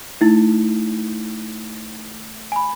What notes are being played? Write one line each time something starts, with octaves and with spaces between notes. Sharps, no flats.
A3 D#4 E4
G#5 B5